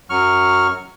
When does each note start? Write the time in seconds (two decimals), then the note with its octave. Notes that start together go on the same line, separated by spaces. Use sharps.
0.10 F#2 F#3 C#6 F6